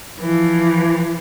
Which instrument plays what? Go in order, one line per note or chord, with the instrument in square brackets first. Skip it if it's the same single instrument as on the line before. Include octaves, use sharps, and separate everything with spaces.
[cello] E3 F3